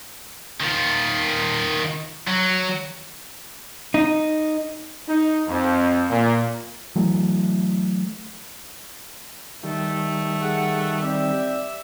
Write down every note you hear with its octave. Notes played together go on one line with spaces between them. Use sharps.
D#3 F4
F#3
D#4
D#4
F2
A#2
E3 F#3 A3
D#3 G3 A3
G#4 F#5
C4 G4 D5 E5